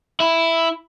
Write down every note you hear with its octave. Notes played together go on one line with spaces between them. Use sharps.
E4